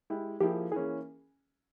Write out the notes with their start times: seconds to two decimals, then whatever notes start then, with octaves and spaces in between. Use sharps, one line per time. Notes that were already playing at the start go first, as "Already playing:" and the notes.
0.10 G#3 E4 G4
0.40 F3 A#3 E4 G4 G#4
0.72 E3 A#3 C#4 G#4